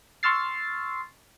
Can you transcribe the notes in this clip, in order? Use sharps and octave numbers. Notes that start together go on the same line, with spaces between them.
C6 C#6 E6 F6 A6 C7